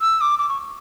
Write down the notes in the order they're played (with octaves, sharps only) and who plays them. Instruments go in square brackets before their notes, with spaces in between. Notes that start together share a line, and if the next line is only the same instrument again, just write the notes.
[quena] E6
D6
D6
C#6